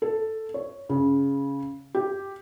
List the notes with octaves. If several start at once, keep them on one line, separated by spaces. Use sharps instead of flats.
A4
C#5
C#3
G4